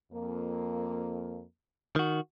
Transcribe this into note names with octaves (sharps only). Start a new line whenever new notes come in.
F2 A#3
D#3 F#4